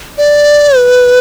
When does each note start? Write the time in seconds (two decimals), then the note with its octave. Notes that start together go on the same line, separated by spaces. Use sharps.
0.18 D5
0.76 B4